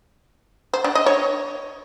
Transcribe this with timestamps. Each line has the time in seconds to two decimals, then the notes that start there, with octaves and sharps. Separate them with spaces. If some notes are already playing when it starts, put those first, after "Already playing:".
0.73 C5
0.84 D4
0.95 D#5
1.06 C#5